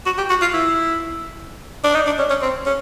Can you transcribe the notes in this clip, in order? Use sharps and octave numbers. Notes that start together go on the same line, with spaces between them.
F#4
G4
F#4
F4
E4
D4
D#4
D4
C#4
C#4
C4
C#4